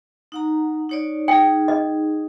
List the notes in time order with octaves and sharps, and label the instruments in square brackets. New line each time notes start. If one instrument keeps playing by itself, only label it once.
[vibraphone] D#4 F#5 A#5
D#4 C#5 D5
[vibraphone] D#4 G#4 [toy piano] G5
[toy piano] D#5